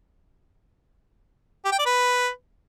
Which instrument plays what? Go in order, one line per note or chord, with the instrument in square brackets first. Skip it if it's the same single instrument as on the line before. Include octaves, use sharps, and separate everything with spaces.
[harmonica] G4
G5
D5
B4